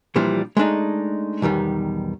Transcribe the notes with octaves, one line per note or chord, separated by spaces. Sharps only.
A#2 E3 F3 G3 D4
G#3 A3 D4 D#4
B1 E2 D#3 G3